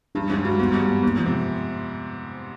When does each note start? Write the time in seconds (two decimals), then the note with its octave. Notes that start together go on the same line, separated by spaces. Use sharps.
0.15 G2 D4
0.30 G#2 D4
0.45 G2 F#4
0.59 G#2 B3
0.74 G#2 G3
0.89 B3
1.02 G#2 A#3
1.17 F3
1.26 C3